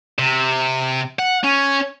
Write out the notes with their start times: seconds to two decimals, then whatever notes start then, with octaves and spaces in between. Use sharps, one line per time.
0.19 C3
1.19 F#5
1.44 C#4